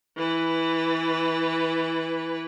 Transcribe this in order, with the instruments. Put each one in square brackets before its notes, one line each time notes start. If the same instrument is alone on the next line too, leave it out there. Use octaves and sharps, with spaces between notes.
[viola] E3 B4